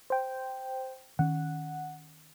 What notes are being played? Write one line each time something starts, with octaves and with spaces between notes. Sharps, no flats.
C5 G5
D#3 C#4 F#5